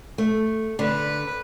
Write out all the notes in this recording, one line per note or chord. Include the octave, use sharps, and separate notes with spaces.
A3
D3 B4